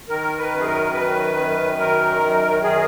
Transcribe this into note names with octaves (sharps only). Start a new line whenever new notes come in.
D#3 A#4
B4
F#2
G#4
A#4
D#3 B4
F#2
D#3 A#4
F#2
D#3 G#4